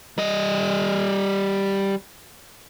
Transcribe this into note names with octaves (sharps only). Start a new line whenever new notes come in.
G3 D#5